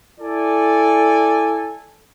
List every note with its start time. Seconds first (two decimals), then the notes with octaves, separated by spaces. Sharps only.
0.20 E4 A4 D5 G#5